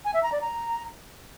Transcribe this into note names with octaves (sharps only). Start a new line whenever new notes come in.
G#5
E5
A#5
D5
A#5